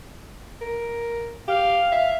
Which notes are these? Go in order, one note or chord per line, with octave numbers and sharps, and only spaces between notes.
A#4
G4 F5
E5